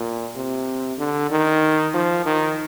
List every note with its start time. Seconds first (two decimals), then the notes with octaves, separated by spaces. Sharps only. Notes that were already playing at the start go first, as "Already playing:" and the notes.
Already playing: A#2
0.36 C3
0.98 D3
1.31 D#3
1.94 F3
2.26 D#3